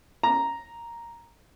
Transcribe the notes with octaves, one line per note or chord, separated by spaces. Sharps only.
A#5